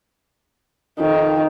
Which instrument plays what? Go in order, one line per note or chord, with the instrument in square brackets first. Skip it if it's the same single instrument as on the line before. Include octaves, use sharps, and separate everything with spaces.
[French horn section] F2 D#4 [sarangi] D#3